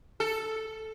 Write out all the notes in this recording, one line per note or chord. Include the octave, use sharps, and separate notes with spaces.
A4